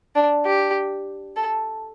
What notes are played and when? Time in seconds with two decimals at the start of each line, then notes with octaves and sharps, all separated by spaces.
0.15 D4
0.46 G4
1.36 A4